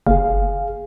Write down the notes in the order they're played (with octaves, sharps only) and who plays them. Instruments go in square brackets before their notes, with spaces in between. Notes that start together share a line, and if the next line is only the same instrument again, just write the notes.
[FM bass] F#1 [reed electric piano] G#4 F5